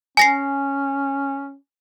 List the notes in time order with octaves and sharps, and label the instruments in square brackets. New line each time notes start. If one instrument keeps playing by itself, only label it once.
[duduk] C#4 [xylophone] G#5 A#6 C7